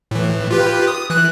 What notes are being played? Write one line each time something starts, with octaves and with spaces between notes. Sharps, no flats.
A2 E3
F4 G4 B4
D#6
E3 F#6